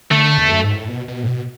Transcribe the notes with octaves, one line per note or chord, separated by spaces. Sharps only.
D3 A3
E2
F#2
G#2
A2
B2
B2
A2
B2